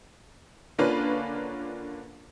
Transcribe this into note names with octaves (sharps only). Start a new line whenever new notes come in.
D3 A#3 C#4 D4 F4 B4